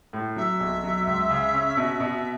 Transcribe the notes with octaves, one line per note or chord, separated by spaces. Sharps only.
A2
F#3 E5
B1
F#3
C#2
C#3
C#4
B2
B2